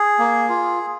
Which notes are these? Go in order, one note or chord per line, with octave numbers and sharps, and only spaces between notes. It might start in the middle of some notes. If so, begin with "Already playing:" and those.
Already playing: G#4
A#3
F4